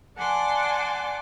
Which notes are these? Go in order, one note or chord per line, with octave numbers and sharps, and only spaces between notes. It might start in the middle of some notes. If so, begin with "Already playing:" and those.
D5 F#5 G#5 A5 C6 D6